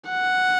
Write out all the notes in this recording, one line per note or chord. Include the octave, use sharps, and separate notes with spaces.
F#5